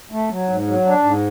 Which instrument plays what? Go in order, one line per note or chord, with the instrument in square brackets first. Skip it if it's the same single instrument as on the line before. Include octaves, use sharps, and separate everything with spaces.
[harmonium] A3
F#3
G#2
F#3
D4
G#2